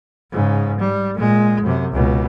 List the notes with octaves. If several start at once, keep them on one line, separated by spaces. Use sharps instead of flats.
G#2 C#3
G3
A#2 G#3
F#2 C3
C#2 B2